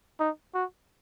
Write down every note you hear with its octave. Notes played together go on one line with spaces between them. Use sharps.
D#4
F#4